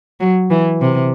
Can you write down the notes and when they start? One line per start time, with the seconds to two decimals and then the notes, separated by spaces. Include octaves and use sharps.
0.20 F#3
0.50 E3
0.81 C3